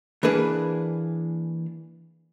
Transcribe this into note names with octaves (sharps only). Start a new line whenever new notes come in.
E3 A#3 D4 G#4 B4